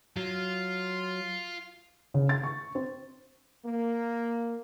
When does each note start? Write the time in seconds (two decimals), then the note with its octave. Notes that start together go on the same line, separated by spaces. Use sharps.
0.17 F#3 F4
2.14 C#3
2.29 A6
2.43 C#6
2.75 C4
3.66 A#3